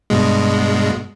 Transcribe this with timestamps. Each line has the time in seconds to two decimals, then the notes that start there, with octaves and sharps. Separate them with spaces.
0.10 G2 B2 G#3